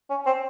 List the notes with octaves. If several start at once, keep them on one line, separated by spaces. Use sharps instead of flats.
C#4
C4